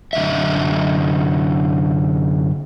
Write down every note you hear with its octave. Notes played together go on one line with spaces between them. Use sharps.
F#2 D3 E3 D#5 E5